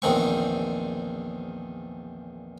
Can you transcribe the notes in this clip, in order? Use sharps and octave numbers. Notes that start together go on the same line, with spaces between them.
A#1 E2 D#3 C4 C#6